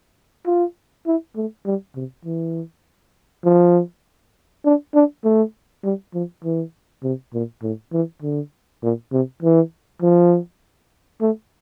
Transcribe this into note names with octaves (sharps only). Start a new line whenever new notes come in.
F4
E4
A3
G3
C3
E3
F3
D4
D4
A3
G3
F3
E3
C3
A#2
A2
E3
D3
A#2
C3
E3
F3
A3